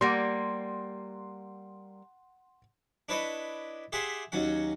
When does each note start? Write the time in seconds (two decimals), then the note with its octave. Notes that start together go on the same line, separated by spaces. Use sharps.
0.01 G3 A#3 F#5 C6
3.09 D4 E4 B4 C#5 D#5
3.92 G4 G#4 E5 F#5 C6
4.32 D#2 F#3 C#4 F#5